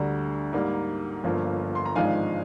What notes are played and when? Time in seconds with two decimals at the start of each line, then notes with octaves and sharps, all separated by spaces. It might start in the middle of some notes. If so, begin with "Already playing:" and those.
Already playing: D2 D3 G3 D4 A#5
0.53 G#2 G3 A#3
1.24 G1 G2 F3 A#3
1.75 C6
1.86 A#5
1.95 G#1 G#2 F3 G#3 D4 F5 G#5